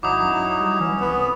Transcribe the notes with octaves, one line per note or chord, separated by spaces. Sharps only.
G#1 F#3 D#4 E4 D6 D#6
F#2
G3
E3 C#4
C2 B3